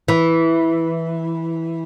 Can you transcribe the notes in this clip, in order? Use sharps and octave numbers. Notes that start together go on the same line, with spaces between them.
E3